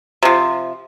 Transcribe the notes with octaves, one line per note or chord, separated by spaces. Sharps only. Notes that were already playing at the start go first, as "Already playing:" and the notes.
C3 F3